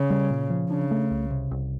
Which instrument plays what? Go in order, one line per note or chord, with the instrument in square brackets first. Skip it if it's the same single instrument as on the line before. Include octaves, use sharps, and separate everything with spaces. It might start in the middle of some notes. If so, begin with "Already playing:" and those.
Already playing: [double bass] C#3
[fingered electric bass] G3
A#2
F3
[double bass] C#3 [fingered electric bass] D4
[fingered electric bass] A3
C2
C3
C2